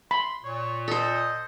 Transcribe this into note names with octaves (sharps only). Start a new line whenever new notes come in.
B5 C6
A#2 C#5
A4 C5 D#5